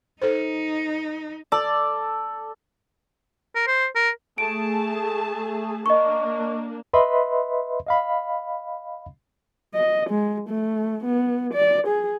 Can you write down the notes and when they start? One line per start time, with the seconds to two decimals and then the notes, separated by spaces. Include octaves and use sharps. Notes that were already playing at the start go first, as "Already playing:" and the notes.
0.22 D#4 A4 C5
1.52 A4 D5
3.55 A#4
3.67 C5
3.96 A#4
4.38 A3 G#4 A5 D7
5.86 A#3 D4 D#5 C#6
6.93 B4 D#5 E5 B5 C6
7.87 D#5 F5 B5
9.74 D#5
10.10 G#3
10.49 A3
11.05 B3
11.54 D5
11.87 G#4